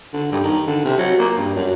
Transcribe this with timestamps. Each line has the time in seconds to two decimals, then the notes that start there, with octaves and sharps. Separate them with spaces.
0.14 D3
0.32 G2
0.43 D#3
0.67 D3
0.85 C3
0.98 F#3
1.19 A#3
1.37 G2
1.56 F#2